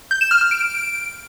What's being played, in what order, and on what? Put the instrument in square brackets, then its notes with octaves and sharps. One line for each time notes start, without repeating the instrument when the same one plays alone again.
[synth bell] G6
E7
F6
F6
D7